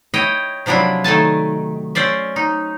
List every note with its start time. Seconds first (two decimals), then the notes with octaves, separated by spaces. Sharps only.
0.14 E4 C#5 D#5 G5
0.66 C3 F3 F#3 D4 E4
1.04 D#3 A3 G#5 A5
1.95 C#4 C5 D5 E5
2.36 D#4